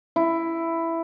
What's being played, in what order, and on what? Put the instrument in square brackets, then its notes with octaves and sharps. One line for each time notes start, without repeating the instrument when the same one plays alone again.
[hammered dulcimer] E4